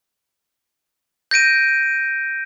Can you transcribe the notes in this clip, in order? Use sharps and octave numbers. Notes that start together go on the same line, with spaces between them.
G6 A#6 D7 D#7